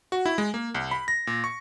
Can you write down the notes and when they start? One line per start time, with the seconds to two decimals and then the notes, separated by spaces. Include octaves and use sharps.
0.12 F#4
0.26 E4
0.38 G#3
0.54 A#3
0.75 C2
0.91 B5
1.08 A#6
1.27 A#2
1.44 C#6